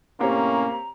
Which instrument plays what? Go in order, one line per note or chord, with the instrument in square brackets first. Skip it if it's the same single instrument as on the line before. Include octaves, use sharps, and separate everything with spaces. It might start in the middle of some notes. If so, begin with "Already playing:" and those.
[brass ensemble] A2 C3 C#4 [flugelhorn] A#3 [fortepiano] C4 G4 C#5 [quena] A#5